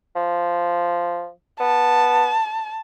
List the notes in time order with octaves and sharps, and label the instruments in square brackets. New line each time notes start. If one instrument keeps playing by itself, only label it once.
[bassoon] F3
[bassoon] B3 [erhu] A5